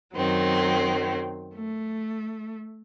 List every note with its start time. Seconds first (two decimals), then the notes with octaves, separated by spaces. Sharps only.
0.15 F#2 D#3 F#3 C4
1.55 A3